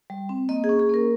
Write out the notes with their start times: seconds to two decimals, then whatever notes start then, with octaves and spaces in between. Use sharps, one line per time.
0.10 G3
0.29 C4
0.49 A#3 D#5
0.64 G#4
0.69 C#4
0.79 G#4
0.89 A#3 A#4